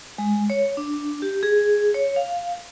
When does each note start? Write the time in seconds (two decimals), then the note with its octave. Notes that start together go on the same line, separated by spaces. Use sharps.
0.18 G#3
0.50 C#5
0.77 D4
1.22 G4
1.43 G#4
1.94 C#5
2.16 F5